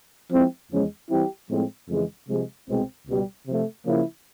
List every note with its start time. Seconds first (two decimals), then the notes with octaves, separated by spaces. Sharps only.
0.29 F3 G#3 C4 E4
0.69 E2 C#3 F3 G#3 C#4
1.09 E3 G3 C4 E4 G4
1.48 A2 F3 G#3 C4
1.88 F2 C#3 E3 G#3
2.28 C3 F3 G#3
2.67 C2 B2 G#3 C4
3.07 C#2 B2 G3
3.46 C3 F3 A3
3.85 C#3 F3 A#3 C#4 E4